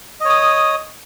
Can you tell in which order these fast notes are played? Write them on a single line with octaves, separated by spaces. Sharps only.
D#5 C#5 D#6